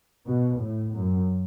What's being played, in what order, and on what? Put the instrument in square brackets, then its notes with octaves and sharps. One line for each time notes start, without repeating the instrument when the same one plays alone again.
[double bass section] B2
A2
F#2